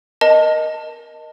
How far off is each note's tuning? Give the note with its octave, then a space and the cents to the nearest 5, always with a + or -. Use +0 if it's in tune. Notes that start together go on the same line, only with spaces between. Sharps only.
A#4 +15 D#5 +0 A5 +20